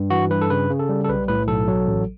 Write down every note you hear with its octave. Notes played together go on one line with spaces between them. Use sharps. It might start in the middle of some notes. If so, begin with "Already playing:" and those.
Already playing: G2
E3 F#4
G2 B4
A4
C#3 B4
C#3
A4
G3
A4
B1 B4
A2 B4
B1 A4
F#3
A1